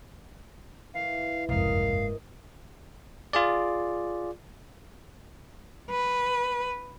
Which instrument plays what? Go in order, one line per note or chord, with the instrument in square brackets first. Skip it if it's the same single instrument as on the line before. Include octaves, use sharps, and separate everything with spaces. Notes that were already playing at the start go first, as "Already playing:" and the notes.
[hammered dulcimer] E3 [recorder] F5
[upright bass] F#1 G#2 [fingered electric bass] C2 F2 [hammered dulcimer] A#3 A#4 D#5 [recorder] F5
[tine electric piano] F4 G#4 D5
[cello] B4